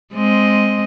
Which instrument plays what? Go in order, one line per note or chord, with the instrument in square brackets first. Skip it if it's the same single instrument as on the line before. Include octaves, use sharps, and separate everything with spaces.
[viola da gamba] G#3 C4 D#5